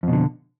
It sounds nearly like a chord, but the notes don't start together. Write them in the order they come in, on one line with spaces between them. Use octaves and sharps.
F2 B2 D3